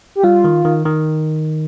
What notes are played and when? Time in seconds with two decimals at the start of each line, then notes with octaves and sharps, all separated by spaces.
0.15 G4
0.23 G3 F4
0.44 D#3
0.65 D#3
0.86 D#3